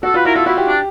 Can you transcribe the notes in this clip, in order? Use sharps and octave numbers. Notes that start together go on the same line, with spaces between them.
F#4 A4
F4 B4
E4 A#4
F4 A4
E4 F#4
G4
D4